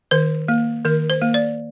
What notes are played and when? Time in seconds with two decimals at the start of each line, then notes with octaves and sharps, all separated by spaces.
0.11 D#3 C5
0.48 A#3
0.85 D#3 A#4
1.10 C5
1.22 A#3
1.34 D5